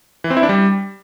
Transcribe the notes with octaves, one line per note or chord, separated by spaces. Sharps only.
E3
C4
E4
D4
G3